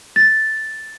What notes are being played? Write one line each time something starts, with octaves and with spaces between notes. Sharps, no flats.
A6